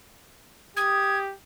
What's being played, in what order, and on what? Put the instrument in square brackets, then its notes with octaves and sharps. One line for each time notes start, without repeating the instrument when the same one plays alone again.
[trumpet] G4 [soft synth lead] D#6 [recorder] G#6